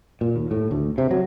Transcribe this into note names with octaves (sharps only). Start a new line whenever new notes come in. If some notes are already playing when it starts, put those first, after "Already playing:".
A#2
D#2
A2
D2
C3
F#3